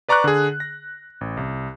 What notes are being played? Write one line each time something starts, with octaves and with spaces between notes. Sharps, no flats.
B4 D5 A#5 C#6 D6 F#6
D3 G#4
A#6
A1
C2